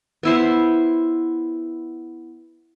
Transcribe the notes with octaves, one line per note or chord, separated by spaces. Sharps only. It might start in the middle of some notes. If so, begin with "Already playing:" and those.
B3 E4 C5